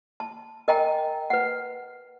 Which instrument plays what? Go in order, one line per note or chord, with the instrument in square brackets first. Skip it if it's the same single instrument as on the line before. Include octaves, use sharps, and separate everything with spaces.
[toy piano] A5
A#4 D#5 G5 G#5 A#5
B4 F#5